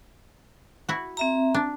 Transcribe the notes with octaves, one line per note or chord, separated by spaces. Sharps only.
E4 F#4
C4 E5 A#5
D4